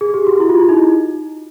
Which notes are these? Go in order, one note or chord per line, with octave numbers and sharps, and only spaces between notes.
G#4
G4
F#4
E4
F4
E4
D#4